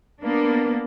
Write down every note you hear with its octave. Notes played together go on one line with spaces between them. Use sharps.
A#3 B3 D4